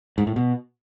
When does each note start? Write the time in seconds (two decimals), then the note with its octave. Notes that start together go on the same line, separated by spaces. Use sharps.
0.18 G#2
0.27 A2
0.36 B2